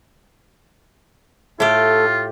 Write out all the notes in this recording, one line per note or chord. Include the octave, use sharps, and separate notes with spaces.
A2 A3 F4 G4 A4